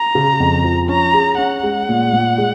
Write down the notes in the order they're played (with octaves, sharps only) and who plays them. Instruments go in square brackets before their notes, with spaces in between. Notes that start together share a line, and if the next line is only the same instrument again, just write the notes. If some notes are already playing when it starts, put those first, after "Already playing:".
Already playing: [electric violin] A#5
[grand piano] C#3
F2
F3
[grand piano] C#4 [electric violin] A#5
[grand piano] G#4
[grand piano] C#4 [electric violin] F#5
[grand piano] G#3
A#2
A#2
G#3